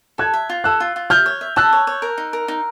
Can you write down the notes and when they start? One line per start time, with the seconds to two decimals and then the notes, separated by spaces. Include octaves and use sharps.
0.18 A4 F#6 G#6
0.34 E5
0.49 F4
0.64 A4 E6 F#6
0.80 F4
0.96 F4
1.10 E5 F6 G6
1.26 C#5
1.41 E5
1.56 A5 E6 F#6
1.73 C#5
1.87 C#5
2.02 A#4
2.18 D#4
2.33 A#4
2.48 D#4